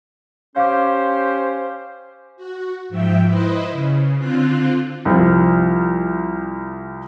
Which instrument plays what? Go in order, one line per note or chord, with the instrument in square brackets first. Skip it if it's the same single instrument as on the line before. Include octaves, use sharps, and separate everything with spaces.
[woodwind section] C#4 G4 C5 [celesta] F5 D6
[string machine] F#4
G#2 F3 E5 G5
E4 B4 C5 D#5
C#3
D3 C4 F4 F#6
[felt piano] C2 F3